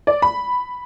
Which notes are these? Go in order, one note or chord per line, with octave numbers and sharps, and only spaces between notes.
D5
B5